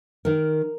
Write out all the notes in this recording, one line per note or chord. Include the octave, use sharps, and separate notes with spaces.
D#3 A#4